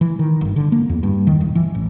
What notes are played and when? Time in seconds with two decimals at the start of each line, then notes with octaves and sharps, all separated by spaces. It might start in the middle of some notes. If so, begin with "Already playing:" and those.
0.01 E3
0.19 D#3
0.41 G1
0.56 D3
0.72 A#3
0.89 E2
1.03 G2
1.27 D#3
1.41 D#1
1.55 E3
1.75 A1